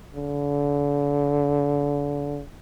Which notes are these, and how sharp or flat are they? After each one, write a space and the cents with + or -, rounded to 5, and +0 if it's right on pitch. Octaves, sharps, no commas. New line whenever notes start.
D3 -35